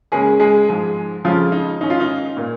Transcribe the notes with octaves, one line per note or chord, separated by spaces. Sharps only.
C#3 G#3 A#3 C#4 G#4
G#3 G#4
G#2 F3 G#3
F2 C#3 F3 G#3 C#4 F4
D#4
G#2 D#3 C#4 D#4
F4
D#4
A#2 A#3